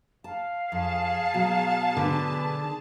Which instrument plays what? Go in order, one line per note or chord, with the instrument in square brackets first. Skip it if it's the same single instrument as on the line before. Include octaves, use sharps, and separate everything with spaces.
[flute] F5 [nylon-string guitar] A5
[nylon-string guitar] F2 [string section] G#4 A5
[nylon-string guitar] B2 F#3
[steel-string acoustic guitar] D3 [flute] B4